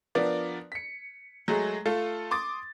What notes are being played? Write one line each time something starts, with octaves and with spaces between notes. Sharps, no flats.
F3 B3 D4 A#4 D5
B6 C#7
F#3 G#3 A3 G#4
A3 F4 A4
C6 D6 D#6 A6